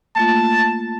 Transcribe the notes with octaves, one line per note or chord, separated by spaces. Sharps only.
A3 A#3 F4 A5